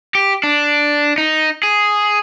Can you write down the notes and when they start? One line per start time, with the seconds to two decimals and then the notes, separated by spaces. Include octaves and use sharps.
0.15 G4
0.43 D4
1.18 D#4
1.63 G#4